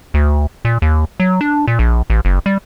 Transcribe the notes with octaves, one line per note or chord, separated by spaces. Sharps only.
D2
A#2
D#2
F#3
D4
A#2
A#1
A1
F#1
G3